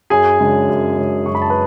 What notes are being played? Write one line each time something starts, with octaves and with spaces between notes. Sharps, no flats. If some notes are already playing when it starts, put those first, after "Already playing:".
F#2 G#4 G#5
C#3 G#3 D4
F#2
C#3 G#3 D4
F#2 C#6
B5
A5
B4 B5